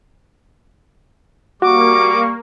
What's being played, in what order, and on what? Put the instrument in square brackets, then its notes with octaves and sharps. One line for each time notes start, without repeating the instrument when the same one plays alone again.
[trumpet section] G3 C#6 [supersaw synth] A#3 [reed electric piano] F#4 [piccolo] D6